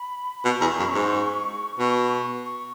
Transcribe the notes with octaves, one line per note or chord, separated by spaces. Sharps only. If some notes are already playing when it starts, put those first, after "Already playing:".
Already playing: B5
B5
B2 C#6
E2
F#2
G#2
B2
C#6